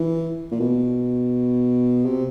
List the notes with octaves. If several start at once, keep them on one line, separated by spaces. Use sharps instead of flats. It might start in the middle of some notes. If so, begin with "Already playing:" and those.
Already playing: E3
A#2
B2
C3